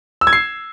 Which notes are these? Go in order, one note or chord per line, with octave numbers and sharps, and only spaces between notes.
E6
G#6
C7